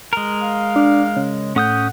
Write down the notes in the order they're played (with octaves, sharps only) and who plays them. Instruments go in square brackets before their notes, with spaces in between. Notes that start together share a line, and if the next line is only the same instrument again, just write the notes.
[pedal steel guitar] G#3 A#4
[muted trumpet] F5
[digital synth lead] D4
C#3
[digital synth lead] A2 [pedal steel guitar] C#4 D#6 G6 [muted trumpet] F#5